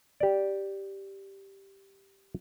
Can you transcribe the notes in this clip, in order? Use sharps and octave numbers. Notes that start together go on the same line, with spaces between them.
G4 D5